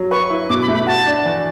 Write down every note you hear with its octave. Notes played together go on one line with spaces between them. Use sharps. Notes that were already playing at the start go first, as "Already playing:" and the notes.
Already playing: F#3
B4 C#6
E4
B2 D6
B5
A3
B5
F#4 A5
D4
E3